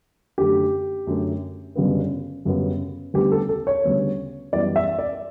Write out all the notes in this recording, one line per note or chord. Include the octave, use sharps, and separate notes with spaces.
F#2 D3 A3 G4
F#2 D3 A3
G1 F#2 C#3 G3 B3
G1 F#2 C#3 G3 B3
D2 C#3 G3 B3 G4
A4
A4
C#5
D2 C#3 G3 B3
F#2 E3 G3 B3 D5
E5
D5